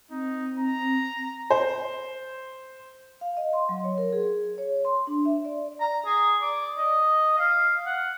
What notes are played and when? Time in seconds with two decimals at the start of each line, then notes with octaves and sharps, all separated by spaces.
0.11 C4 D#4
0.58 A#5
1.50 C5
3.21 F5
3.37 D#5
3.53 C6
3.69 F#3
3.84 C#5
3.98 A#4
4.13 G#4
4.58 C#5
4.85 C6
5.07 D4
5.25 E5
5.45 D5
5.81 A#5
6.06 G#4
6.42 D5
6.78 D#5
7.38 F5
7.86 F#5